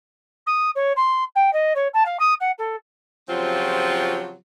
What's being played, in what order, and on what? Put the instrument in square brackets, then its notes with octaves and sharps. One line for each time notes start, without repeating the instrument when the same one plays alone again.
[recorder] D#6
C#5
C6
G5
D#5
C#5
A5
F5
D#6
F#5
A4
[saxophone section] C#3 F3 F#3 C4 F4 G4